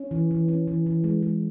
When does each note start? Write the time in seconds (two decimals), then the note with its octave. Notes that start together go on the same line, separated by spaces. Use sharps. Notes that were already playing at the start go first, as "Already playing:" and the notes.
Already playing: C#4
0.11 E3
0.31 E3
0.48 C#4
0.67 E3
0.86 E3
1.04 G#3
1.23 G#3